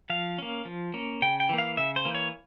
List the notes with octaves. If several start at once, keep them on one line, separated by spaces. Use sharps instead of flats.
F3 F5
A#3 C#4
F3
A#3 C#4
C#3 G5
G5
E3 A#3
F5
C#3 E5
C5
E3 A#3
C#5